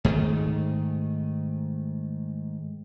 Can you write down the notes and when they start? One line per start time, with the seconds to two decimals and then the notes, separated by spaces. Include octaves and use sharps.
0.05 G#2 D#3 A3